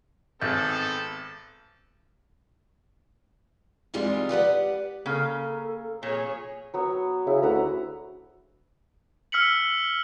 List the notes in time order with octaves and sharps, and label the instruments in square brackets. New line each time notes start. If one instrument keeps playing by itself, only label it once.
[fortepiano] G#1 [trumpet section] B3 C4 A4 [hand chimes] G6 [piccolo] A6
[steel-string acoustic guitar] C3 E3 G3 G#3 F4 G4
G4 B4 D5 F#5
[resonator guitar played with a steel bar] C#3 [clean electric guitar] A#3 A#4 F5 [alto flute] A4
[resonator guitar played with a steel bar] A#2 [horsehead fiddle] G#4 C#5
[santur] F#3 B3 C#5
[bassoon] C#3 [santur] E4
[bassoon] D2 [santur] F#4 B4 A#5
[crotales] E6 F6 B6 C#7 F#7